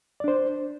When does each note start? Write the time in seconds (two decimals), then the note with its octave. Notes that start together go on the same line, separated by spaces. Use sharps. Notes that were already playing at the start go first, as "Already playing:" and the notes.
0.20 D5
0.24 D4
0.28 C5